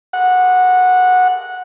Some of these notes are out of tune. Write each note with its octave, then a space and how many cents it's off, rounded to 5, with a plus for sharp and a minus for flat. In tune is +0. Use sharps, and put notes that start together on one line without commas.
F#5 -15